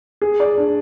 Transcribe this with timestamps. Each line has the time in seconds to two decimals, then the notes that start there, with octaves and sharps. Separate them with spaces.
0.22 G#4
0.40 D5
0.58 D4